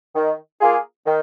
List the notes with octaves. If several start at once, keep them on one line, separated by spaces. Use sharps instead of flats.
D#3
A#3 F4 G#4
D#3